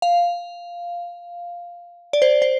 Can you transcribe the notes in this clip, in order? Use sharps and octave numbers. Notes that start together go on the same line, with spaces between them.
F5
D5
C5
C5